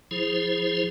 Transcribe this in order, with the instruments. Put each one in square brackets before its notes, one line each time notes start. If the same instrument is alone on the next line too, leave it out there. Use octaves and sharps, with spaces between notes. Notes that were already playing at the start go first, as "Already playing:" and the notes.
[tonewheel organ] F3 E4 G#4 C5